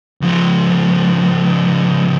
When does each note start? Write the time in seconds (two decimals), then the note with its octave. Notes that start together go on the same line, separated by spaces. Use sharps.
0.22 C#2 F3